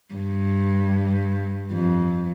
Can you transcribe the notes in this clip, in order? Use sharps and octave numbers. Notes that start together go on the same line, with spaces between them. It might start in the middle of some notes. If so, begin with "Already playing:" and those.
G2
F2